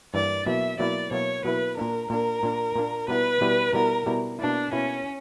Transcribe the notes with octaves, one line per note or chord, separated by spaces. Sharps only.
G2 E3 A#3 D5
B2 F#3 A#3 E4 E5
B2 F#3 A#3 E4 D5
B2 F#3 A#3 E4 C#5
B2 F#3 A#3 E4 B4
A#2 A#3 D4 A#4
A#2 A#3 D4 A#4
A#2 A#3 D4
A#2 A#3 D4
B2 G3 B3 E4 B4
B2 G3 B3 E4
B2 G3 B3 E4 A#4
B2 G3 B3 E4
B2 A#3 D4 E4
B2 A#3 C#4 E4